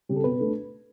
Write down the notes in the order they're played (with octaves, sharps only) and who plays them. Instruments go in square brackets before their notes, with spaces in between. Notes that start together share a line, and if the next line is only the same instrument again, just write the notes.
[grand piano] C#3 G3
[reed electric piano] A4
[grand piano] B2 [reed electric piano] B4
[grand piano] A3 D4 A4